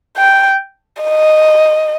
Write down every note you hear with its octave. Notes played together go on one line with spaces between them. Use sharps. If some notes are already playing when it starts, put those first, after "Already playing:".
G5
D#5